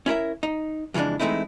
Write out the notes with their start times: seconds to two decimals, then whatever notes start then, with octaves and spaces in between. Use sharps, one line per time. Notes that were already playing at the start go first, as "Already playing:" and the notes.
0.06 C#4 E4 A#4 E5
0.43 D#4
0.94 F2 C#3 E3 G#3 D4
1.19 E3 G#3 A3 C4 D#4 E4